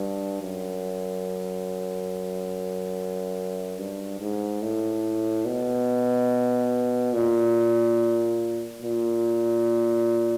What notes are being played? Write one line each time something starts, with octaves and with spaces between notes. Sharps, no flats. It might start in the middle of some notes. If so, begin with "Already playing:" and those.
Already playing: G2
F#2
G2
G#2
A2
B2
A#2
A#2